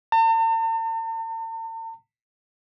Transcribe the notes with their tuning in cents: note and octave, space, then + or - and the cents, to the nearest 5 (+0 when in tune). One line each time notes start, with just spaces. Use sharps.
A5 +45